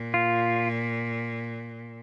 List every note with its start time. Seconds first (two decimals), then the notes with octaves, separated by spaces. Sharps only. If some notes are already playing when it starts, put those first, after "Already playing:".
Already playing: A#2
0.14 F4